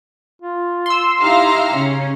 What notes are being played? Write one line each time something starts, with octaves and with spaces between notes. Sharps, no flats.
F4
C6 E6
D#4 E4 G4 F5 A#5
C#3 C#4